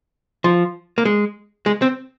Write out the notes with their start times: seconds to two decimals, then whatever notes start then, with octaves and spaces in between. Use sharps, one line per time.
0.44 F3
0.98 A#3
1.05 G#3
1.66 G#3
1.82 C4